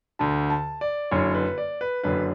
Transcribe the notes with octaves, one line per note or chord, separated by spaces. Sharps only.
D2 D3 A5
A5
D5
F#1 F#2 D3 C#5
B4
D5
B4
F#1 F#2 D3 B4